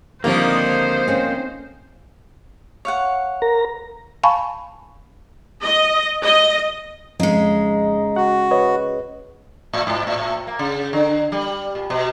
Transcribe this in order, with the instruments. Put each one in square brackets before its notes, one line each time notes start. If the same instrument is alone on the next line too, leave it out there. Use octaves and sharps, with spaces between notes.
[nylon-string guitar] D3 G3 C4 [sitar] D#3 F3 [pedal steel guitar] A#3 [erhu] C5
[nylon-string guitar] C4 C#4
[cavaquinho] C#5 F5 F#5
[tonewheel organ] A#4 A#5
[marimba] F5 G#5 A5 B5 C#6
[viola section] D#5
D#5
[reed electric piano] F2 [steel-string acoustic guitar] C#3 G#3 [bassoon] D#4
[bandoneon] F#4 [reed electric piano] F#5
[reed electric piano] B4 C#5 D#5
[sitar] A2
G#2
A2
A#3
C#3
D3
G3
A#2
B2